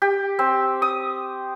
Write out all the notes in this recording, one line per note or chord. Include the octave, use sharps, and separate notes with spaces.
G4
C4
D#6